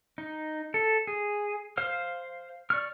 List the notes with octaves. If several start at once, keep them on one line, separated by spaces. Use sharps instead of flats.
D#4
A4
G#4
C5 F5 F6
D5 C#6 F6